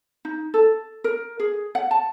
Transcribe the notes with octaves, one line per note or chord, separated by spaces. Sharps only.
D#4
A4
A#4
G#4
F#5
A5